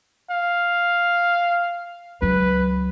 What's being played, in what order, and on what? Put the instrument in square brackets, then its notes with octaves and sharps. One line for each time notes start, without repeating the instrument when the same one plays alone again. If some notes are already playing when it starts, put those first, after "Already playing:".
[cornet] F5
[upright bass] C#2 F#3 [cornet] B4